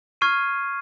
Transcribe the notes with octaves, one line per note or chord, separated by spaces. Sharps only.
C#6 F6 G#6 C7 D#7